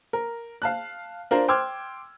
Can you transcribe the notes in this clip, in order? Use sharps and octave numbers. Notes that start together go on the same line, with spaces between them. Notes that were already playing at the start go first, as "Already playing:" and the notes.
A#4
F5 A5 F#6
D4 F4 A#4 C5
G5 C6 D6 E6 F6 G#6